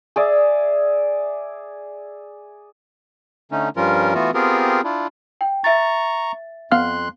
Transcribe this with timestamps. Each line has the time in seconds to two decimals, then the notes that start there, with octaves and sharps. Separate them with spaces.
0.16 G#4 D5 E5
3.52 D3 A3 C#4 D#4
3.77 G2 F3 G3 C#4 F4 A#4
4.14 E3 A3 B3 F4 F#4
4.34 B3 C4 F4 G4 G#4 A#4
4.84 D4 E4 F4
5.41 G5
5.64 E5 A#5 C#6 A6
6.72 F2 B3 F5 C6 F6 F#6